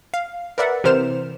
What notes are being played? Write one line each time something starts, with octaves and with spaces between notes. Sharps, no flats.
F5
A#4 B4 D5 E5 F#5
C3 E3 A#4 C5 F6 E7